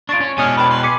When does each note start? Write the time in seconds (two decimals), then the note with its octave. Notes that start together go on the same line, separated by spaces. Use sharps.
0.09 D4 F4 C#6 A6 D7
0.20 C#4
0.38 B2 G#3 C#4 D4 C#5 G#5 D#6 F6
0.57 D4 B4 G5 A5 B5
0.70 B4 C6
0.83 G#4 D6 B6 C#7